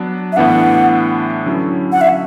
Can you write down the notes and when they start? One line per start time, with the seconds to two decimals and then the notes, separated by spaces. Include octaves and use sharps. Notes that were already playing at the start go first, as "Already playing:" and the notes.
Already playing: F#3 B3 D4
0.33 E5
0.36 A2 E3 B3 D4 F#5
1.46 D3 F#3 C#4 E4
1.92 F#5
2.01 E5